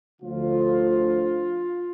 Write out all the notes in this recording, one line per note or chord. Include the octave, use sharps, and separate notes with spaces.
D2 D3 F3 F4